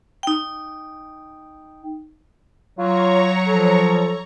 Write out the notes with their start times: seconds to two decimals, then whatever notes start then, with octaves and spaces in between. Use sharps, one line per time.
0.23 D#4 G5
2.79 F#3 F4 C#5 A#5 C#6
3.47 F3 A4